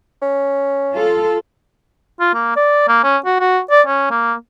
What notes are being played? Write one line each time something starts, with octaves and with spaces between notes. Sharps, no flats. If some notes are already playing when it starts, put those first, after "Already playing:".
C#4
F4 A4
F4
A#3
D5
A#3
C#4
F#4
F#4
D5
C#4
A#3